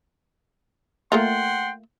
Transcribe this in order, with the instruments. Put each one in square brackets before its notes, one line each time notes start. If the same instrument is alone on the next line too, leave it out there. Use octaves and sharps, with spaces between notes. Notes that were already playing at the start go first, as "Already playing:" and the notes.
[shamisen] A3 A#3 F4 [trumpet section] F#5 G5 C6